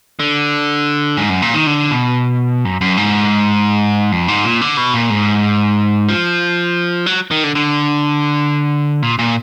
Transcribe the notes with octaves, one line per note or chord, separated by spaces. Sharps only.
D3
G#2
F#2
A#2
D#3
D3
B2
F#2
F#2
G#2
F2
G#2
A#2
D3
B2
A#2
G#2
F3
F#3
D#3
D3
D3
A#2
A#2